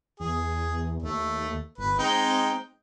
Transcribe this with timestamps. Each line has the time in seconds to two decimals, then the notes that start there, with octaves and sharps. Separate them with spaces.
0.20 E2 G#4
1.02 D#2 A3
1.78 G1 B4
1.99 G#3 C4 D#4 G5